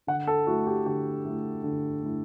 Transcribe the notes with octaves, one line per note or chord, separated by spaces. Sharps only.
D3 F#5
A4
A3 E4 F#4
G4
D3 G4
A3 E4
D3
A3 E4